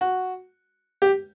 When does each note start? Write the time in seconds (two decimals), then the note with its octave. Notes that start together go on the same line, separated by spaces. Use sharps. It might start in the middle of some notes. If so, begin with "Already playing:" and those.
0.01 F#4
1.02 G4